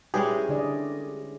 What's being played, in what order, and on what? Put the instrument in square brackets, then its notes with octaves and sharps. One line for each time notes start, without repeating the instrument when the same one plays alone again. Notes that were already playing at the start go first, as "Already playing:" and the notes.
[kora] G3 G#3 C#4 [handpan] E4 B4 C#5 [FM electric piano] G4 G#4
[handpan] D3 D5 D#5